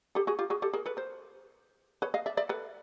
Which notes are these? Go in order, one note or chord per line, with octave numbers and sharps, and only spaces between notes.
G4 A4
F#4 G#4
F4 G4
F#4 G#4
G4 A4
G#4 A#4
A4 B4
A#4 C5
B4 C#5
D#5 F5
D5 E5
D5 E5
A4 B4